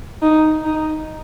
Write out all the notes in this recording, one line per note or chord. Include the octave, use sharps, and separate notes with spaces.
D#4
D#4